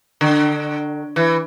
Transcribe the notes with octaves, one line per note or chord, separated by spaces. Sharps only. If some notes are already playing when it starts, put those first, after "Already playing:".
D3
E3